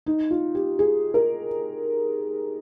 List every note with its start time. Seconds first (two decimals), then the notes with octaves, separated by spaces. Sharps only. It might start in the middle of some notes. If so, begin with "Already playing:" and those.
0.06 D#4
0.31 F4
0.55 G4
0.79 G#4
1.14 A#4